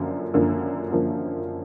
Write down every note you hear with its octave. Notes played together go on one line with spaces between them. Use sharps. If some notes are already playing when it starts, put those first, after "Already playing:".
Already playing: F#2 D3 F3 A#3
F#2 D3 F3 A#3
F#2 D3 F3 A#3